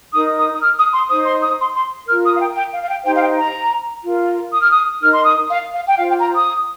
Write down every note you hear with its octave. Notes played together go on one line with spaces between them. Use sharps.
D#4 A#4 D#6
D#6
D#6
F6
D#6
C6
D#4 C5 D#6
C6
D#6
C6
C6
F4 A#4 F6
D#6
F5
G5
G5
F5
F5
G5
D#4 G4 C5 G5
F5
G5
A#5
F4 A#4
D#6
F6
D#6
D#4 A#4 F6
C6
D#6
F5
F5
G5
F4 C5 F5
G5
A#5
D#6